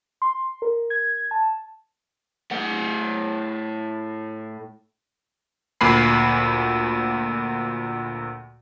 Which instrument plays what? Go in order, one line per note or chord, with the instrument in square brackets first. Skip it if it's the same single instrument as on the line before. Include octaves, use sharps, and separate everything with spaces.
[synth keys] C6
A#4
G#6
A5
[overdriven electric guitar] A2 F#5
[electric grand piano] D2 A#2 G#5 B5 C7